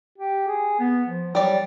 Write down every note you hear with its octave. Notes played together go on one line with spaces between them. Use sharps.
G4
G#4
B3
F3
F#3 G3 D5